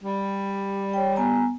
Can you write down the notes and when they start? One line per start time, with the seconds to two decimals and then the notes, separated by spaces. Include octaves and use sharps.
0.02 G3
0.93 C#5 G5
1.16 B3 G#5 A#5